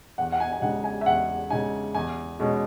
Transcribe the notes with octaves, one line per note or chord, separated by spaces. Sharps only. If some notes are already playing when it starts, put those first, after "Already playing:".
E2 F#5
F#5
G#5
G#5
C#3 G#3 D#4 F#5
G#5
E5
E2 F#5
C#3 G#3 D#4 G#5
E2 G#5
B2 G#3 C#4